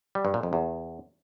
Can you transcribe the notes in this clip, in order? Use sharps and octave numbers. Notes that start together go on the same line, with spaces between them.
G3
G2
A#2
F2
E2